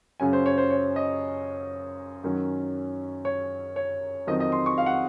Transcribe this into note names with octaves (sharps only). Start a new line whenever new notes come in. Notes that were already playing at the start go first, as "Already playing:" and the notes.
F#2 C#3 F#3 C#4 G#5
C5
C#5
C5
C#5
D#5
F#2 D#3 F#3 C#4
C#5
C#5
F2 D#3 F#3 C4 D#5
D#5
C6
C#6
F5
F#5